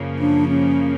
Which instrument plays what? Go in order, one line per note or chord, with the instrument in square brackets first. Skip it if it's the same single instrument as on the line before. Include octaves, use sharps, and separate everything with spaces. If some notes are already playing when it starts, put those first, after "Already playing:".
Already playing: [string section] F#2 C#3 F3 A#3
[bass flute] D4
C#4